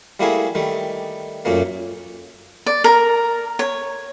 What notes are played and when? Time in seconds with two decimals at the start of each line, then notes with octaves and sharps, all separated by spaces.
0.20 G3 A3 A#3 E4 F#4 G#4
0.55 D#3 G3 A3
1.45 F#2 A#2 A3 A#3
2.66 D5
2.84 A#4
3.59 C#5